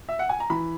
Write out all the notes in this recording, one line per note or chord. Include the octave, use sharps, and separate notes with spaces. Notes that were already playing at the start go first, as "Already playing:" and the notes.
E5
F#5
G#5
A#5
E3 B5